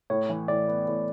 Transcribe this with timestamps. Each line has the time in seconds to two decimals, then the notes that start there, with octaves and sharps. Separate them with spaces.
0.10 A2 C#5
0.29 E3
0.48 A2 D5
0.68 B3
0.88 A2